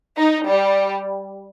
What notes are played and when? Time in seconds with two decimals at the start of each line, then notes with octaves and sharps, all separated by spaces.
0.17 D#4
0.48 G3